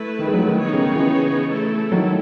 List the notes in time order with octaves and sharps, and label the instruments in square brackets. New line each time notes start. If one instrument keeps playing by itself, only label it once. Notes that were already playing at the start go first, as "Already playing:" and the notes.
Already playing: [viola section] A3 E4 B4
[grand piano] D#3
G#3
D#3 F#3
D#3
[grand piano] D#3 [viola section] B3 D#4 G#4 C#5
[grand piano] C#3
D#3
C#3 E3
[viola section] A3 E4 A4
[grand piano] D#3 F#3